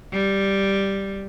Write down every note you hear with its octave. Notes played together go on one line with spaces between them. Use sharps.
G3